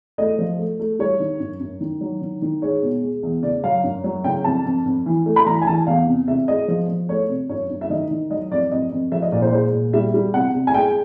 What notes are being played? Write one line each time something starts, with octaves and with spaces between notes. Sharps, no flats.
A3 D#5
F3
A3
A3
G3 C#5
D#3
F#2
F#2
D#3
F#3
D#3
D#3
G#3 C#5
B2
G#3
E2
C#3 D5
F#3 F5
F#2
F#3
C#3 G5
F2 A5
F2
F2
E3
A3
B5
E3 A#5
G#5
E3 A5
E2 F5
C3
C3 E5
G#3 D#5
F3
F3
A3 C#5
C3
F#2 C#5
F#2
E5
D#3 D#5
D#3
F#3 D#5
F2 D5
F2 D#5
F2
F3 E5
D#5
A#2 D5
C5
G#3 C5
A#2
G3 E5
G3
C3 F#5
C3
G#5
G#3 G5